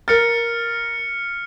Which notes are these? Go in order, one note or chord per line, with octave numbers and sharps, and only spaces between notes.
A#4 F6 A6 C#7